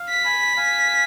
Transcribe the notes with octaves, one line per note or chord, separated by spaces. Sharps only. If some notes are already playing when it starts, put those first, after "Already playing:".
Already playing: F5
B6
G#5 B5
F5 G#5